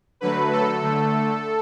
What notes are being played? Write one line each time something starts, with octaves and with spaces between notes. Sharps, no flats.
D3 F#3 A3 B4
A4
D3 A3